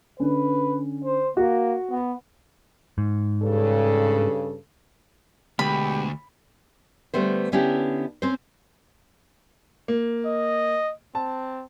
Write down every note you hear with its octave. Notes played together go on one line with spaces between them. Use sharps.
D3 C#4 B4
C5
A#3 F#4
B3
G#2
G2 C#3 A4
D2 B2 G#3 G4 B4 B5
D3 G3 A3 B3 C5
D3 B3 C#4 D4 E4 G4
C4 C#4 C5
A#3
D#5
C4 A5